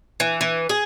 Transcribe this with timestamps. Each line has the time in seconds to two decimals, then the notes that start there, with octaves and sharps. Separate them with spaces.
0.20 E3
0.41 E3
0.69 G#4